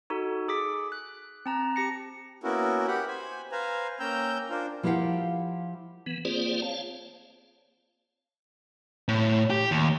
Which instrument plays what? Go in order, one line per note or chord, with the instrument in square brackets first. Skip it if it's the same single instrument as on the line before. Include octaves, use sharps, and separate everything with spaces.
[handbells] D#4 F#4 A4
G#4 D6 B6
F#6
C4 A5 A#5
G4 A#6 C#7
[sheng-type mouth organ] A#3 B3 C#4 E4 F#4 A#4
G4 F#5 B5
C5 G#5 B5
B4 C5 F5 G#5 A#5
A#3 C#4 G5 A#5 E6 G6
D4 F4 A#4 C5
[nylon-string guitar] F3 E4 G4 A#4 F5 F#5
[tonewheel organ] E3 B3
A#3 C4 F4 G#4 C5 D5
C#5 F5 A5
[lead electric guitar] A2
G4
D#2